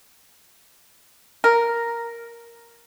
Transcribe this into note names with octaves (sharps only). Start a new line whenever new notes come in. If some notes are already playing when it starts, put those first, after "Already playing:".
A#4